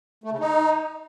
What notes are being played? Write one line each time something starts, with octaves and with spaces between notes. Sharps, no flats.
A3
C#3
D#4